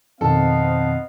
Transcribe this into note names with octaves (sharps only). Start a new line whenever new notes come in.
F2 B2 D#3 B3 C4 A4 D#5 F5